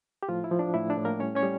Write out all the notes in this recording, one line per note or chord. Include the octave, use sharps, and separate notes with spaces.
G4
A2 F3 F4
E4
F3
D4
A2 E4
D4 D5
A2
A#3 A#4
G3 C#4 C#5
C#4 C#5
G3